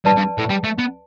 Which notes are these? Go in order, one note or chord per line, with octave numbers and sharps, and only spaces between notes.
G2 B4 D5 A5
G2
A2
G3
A3
B3